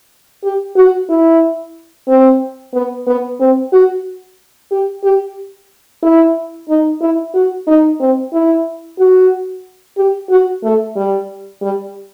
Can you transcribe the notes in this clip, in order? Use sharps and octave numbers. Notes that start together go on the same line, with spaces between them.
G4
F#4
E4
C4
B3
B3
C4
F#4
G4
G4
E4
D#4
E4
F#4
D#4
C4
E4
F#4
G4
F#4
A3
G3
G3